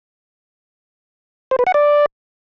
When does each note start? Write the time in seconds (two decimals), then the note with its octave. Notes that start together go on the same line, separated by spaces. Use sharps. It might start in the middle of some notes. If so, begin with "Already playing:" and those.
1.51 C5
1.59 B4
1.67 F#5
1.74 D5